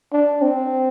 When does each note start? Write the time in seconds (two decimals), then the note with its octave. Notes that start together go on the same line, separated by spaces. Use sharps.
0.13 D4
0.42 C4